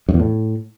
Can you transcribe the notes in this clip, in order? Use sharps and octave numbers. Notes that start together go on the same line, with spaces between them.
F#2
E2
A2